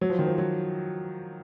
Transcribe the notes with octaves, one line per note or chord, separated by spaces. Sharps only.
F#3
F3
D#3
F3
F#3